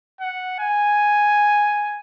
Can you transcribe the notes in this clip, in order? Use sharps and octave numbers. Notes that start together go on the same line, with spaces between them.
F#5
G#5